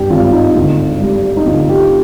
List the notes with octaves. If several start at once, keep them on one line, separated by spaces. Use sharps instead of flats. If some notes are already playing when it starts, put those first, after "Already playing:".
Already playing: G2 G4
G#1 F4
D#4
D2
G3
D#4
D2 F4
G4